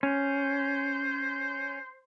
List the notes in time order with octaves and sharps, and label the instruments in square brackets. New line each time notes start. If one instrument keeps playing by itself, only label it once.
[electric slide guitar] C#4 [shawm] C5